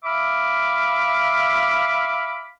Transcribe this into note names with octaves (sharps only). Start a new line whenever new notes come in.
E5 F5 B5 D6